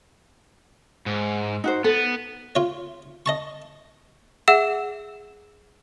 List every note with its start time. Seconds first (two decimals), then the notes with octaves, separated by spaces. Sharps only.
1.06 G#2
1.64 D#4 F#4 C5
1.84 B3 A4
2.55 F4 C#5
3.26 D#5 A5 C#6
4.48 G#4 E5 F#5 E6 E7